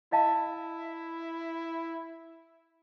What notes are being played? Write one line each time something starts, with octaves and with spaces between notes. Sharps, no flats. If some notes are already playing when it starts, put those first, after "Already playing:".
E4 D#5 F5 A5